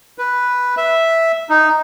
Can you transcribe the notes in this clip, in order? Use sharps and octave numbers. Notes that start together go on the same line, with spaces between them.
B4
E5
D#4